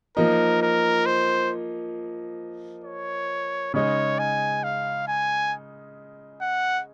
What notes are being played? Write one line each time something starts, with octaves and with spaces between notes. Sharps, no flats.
F3 A#3 D#4 A#4
A#4
C5
C#5
C#3 G#3 D#4 C#5
G#5
F5
G#5
F#5